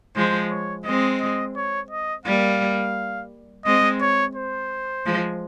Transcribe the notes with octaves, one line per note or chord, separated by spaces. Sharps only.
F3 G#3 C5
C#5
G#3 C4 D#5
D#5
C#5
D#5
G3 A#3 F5
G#3 C4 D#5
C#5
C5
F3 G#3